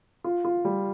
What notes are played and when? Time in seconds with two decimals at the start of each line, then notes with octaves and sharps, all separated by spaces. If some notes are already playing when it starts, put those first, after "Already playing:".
0.24 F4
0.45 F4
0.65 G3